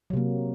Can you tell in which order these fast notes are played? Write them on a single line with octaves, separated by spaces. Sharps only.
F#3 C3 A#3